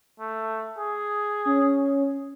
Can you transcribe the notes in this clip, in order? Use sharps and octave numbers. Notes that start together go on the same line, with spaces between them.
A3
G#4
C#4